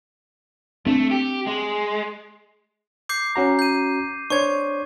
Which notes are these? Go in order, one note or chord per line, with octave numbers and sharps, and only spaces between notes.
A3 C4 D4
G4
G#3
D6 G6 C7
C#4 F#4 A#5
G6 D#7
D4 C5 C#5 C#6 G#6